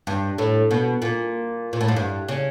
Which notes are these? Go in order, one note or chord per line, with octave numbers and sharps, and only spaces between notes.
G2
A2
B2
A#2
A#2
A2
G#2
G2
C#3